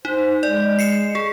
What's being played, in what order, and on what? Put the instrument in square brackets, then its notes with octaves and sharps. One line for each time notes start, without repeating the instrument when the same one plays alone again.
[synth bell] D#4 [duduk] C5
[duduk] G#3 [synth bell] D5
[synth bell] C7 C#7 E7
G#4